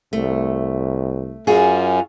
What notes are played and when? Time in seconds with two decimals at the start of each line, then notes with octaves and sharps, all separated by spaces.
0.13 C2 A3
1.47 F#2 F4 F#4 G#4